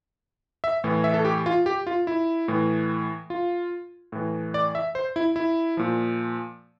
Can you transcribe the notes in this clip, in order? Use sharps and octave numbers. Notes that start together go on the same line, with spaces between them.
E5
A2 E3
E5
A4
G4
F4
G4
F4
E4
A2 E3
F4
A2 E3
D5
E5
C5
E4
E4
A#2 F3